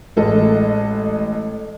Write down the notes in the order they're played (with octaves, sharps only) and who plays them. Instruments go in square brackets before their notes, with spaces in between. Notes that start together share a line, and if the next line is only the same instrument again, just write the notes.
[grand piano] A1 G#3 A4 D#5